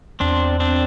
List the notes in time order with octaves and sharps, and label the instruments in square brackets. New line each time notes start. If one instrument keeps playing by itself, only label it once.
[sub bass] E2 [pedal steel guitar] C4 D4
[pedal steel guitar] C4 D4